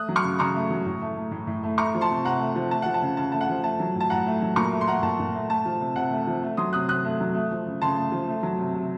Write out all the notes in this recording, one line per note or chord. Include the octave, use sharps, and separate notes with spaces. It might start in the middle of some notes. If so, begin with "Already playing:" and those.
Already playing: A3 D#6 F#6
F#3
C#6 F6
C#3
C#3 A#5 C#6
A3
F#3
A2
A3
A3
A2
A2
A3
A3 A#5 C#6
F3
A5 C6
C3
C3 F#5 A#5
A3
F3
A3 A5
F3 F#5
A5
C#3
C#3 A5
A3 A5
F#5
F3
A3 A5
F#3
A2 A5
A2 F#5 A#5
A3
F#3
A#2 A#5 C#6
A3
C6
A3 F#5 A#5
A#2 A5
A#2
A3
A3 A5
F3
C3
C3 F#5
A3
F3
A3
F#3 C6 D#6
C3 D#6 F#6
C3 D#6 F#6
A3
F#3
A3
F3
C#3
C#3 A5 C6
A3
F3
A3
F#3
C3
C3